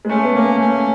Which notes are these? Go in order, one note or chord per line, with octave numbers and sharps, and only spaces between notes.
G#3
A3 C#4
B3
A#3 C#4
A3 C#4